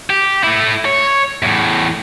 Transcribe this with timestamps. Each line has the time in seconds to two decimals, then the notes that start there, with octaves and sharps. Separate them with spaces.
0.10 G4
0.43 A3 E4
0.85 C#5
1.43 E2 A2